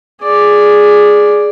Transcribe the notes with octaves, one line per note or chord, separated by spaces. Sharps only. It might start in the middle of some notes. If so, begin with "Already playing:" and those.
G#4 D5